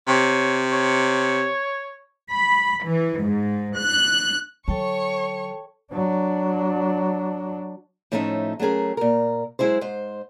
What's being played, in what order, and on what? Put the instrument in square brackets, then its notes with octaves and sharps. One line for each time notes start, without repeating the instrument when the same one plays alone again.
[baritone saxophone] C3 [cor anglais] C#5
[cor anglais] C#5
[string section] B5
E3
G#2
F#6
[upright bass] D3 F#3 [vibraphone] A4 G5 A5 [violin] C#5 C#6
[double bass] F#3 D4
[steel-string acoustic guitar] A2 F3 A3 C#4 D#4 E5
F#3 A3 C#4 G#4 A#4
A#2 A#4
F#3 G#3 E4 G#4 C5
G#2 C5